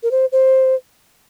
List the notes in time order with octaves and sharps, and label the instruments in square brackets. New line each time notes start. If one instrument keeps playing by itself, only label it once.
[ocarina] A#4
C5
C5